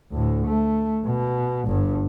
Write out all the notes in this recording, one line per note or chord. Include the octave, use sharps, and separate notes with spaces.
D2 A2
A3
B2
G1 G2